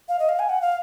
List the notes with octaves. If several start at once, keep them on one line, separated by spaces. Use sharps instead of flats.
F5
D#5
F5
G#5
F#5
F5